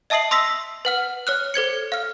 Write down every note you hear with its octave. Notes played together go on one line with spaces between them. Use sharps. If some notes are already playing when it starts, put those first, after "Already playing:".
D#5 E5 A5 D#6 C7 F#7
C6 D#6 E6 A#6 B6
B4 F#5 F6
C#5 F6 F#6
A4 C5 G#6 C#7
F5 F6